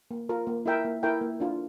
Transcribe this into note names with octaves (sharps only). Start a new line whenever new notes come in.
A#3
F4 A#4
A#3
E4 A#4 E5 G5
A#3
E4 A#4 E5 G5
A#3
D4 F4